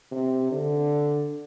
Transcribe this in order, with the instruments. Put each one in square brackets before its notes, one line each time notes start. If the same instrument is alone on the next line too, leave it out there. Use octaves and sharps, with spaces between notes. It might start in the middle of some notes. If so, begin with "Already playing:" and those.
[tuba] C3
D3